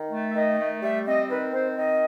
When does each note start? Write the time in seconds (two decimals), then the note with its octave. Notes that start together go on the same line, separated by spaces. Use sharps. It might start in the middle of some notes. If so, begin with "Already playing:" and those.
Already playing: D#3
0.11 A3
0.31 E5
0.35 D#3 D#5
0.59 A3
0.82 G3 E5
1.06 C4 D#5
1.29 D#3 B4
1.53 C4 C5
1.77 D#3 D#5